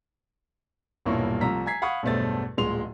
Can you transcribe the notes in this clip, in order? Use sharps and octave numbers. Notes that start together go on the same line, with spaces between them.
D#1 B1 G2 A#3 E4 C#6
C2 F3 A3 A#5 E6 B6
G#5 A#5 G#6 B6 C7
F5 F#5 B5 C#6 D#6 G#6
B1 E2 G2 A3 C5 A6
D1 A#2 G#3 C6 F7